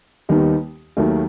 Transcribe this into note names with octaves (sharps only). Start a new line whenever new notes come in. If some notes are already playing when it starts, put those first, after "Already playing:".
D#2 D#3 G3 B3 D#4
D#2 D#3 F#3 A3